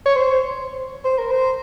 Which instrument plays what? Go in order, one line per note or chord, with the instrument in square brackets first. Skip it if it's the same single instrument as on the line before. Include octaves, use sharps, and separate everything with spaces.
[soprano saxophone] C#5
C5
C5
A#4
C5